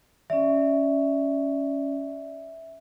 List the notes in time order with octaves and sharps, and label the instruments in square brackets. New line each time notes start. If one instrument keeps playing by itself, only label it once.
[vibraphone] C#4 D5 [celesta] E5